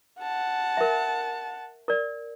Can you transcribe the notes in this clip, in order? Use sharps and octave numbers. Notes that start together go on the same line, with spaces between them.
F#5 A5
A#4 E5
A#4 D5